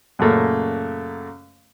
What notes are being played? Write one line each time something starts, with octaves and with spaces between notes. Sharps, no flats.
F#2 A#2 C#3 A3 A#3